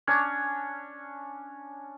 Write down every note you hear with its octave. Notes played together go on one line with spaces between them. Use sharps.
C#4 D4 C#5